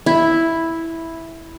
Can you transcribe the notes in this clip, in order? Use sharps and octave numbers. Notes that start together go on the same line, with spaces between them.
E4